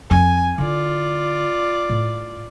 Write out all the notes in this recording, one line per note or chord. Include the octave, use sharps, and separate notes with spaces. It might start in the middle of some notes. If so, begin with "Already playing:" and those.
F2 G#5
D3 E4 F4 D5
A2